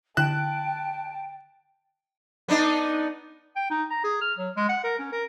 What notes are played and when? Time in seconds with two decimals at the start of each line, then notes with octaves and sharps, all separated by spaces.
0.17 D3 E4 G5 A5 F#6 E7
2.48 B3 D4 D#4
3.56 G5
3.70 D#4
3.90 A#5
4.04 G#4
4.21 F6
4.38 F#3
4.57 G#3
4.69 F#5
4.84 A#4
4.99 C#4
5.12 A#4